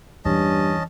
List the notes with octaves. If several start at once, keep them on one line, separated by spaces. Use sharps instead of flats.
E2 G2 E3 C#4 D#5 A5